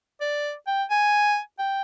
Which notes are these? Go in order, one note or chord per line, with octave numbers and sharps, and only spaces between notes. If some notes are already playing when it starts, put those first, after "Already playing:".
D5
G5
G#5
G5